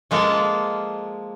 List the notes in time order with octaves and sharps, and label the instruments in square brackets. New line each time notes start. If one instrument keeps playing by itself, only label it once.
[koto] F3 G#3 A#3 F4 A4 A5